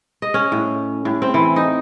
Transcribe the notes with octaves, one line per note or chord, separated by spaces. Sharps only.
D#5
C#4
A2
A2
C4
E3
D#4